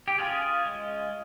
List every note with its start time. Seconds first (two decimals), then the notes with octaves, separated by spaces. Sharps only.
0.08 G4
0.18 C#4 F4 G#4
0.66 G#3